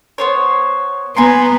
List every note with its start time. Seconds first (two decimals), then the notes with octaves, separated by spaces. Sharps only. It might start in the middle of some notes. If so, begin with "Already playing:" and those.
0.18 B3 C5 C#5
1.17 B3 G#5 A#5 C6